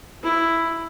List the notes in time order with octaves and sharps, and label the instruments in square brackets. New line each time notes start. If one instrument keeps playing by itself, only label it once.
[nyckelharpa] E4